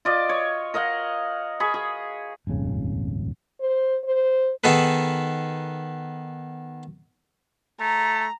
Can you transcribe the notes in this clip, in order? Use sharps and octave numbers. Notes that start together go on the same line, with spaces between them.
F4 D5 D#5
C#5
A#4 D#5 F5 F#5
G#4 B5 C#6
G#4
D#1 G#1 F2 C#3
C5
C5
D#3 B3 D#4 G#4 A4 B4
A3 A#5